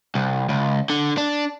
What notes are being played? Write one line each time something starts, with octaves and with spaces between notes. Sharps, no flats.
C2
C#2
D3
D4